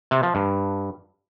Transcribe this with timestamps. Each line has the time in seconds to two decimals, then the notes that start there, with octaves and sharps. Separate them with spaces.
0.11 C3
0.23 F3
0.35 G2